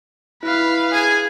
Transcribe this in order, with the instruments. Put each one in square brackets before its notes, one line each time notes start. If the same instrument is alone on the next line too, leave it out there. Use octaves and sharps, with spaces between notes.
[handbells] E4 [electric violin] B4 F5
[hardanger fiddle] G#4 G#5